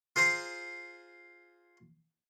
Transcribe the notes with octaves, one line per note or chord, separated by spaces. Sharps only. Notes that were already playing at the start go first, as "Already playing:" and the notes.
F4 G#4 C5 A#5 C6